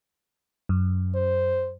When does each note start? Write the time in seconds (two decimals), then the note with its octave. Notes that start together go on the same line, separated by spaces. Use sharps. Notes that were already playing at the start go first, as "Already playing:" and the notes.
0.69 F#2
1.15 C5